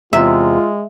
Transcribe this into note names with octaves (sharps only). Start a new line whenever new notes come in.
E2 C3 G#3 F4 E5